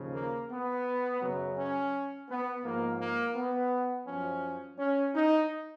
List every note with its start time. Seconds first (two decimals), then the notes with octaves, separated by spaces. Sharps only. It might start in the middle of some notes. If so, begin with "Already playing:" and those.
Already playing: D#2 C#3 F3
0.15 A#3
0.50 B3
1.21 F#2 C#3 F#3
1.57 C#4
2.29 B3
2.64 G#2 F3 A#3
3.00 A#3
3.35 B3
4.06 F3 C#4
4.11 F#2
4.78 C#4
5.14 D#4